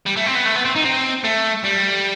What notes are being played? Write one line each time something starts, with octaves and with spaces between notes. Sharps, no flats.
G3
A3
C4
B3
A3
B3
C4
D#4
C4
A3
G3